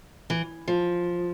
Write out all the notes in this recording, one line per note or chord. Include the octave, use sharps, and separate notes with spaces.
E3
F3